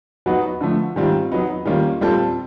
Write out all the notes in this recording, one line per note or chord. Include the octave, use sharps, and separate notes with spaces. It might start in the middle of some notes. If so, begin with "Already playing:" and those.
F#3 B3 D#4 F#4 B4
D3 F3 A3
G#2 D#3 G3 C4 F4
F#3 B3 D#4
D#3 G3 A#3 C#4 F4
A#2 G3 C4 F4 A4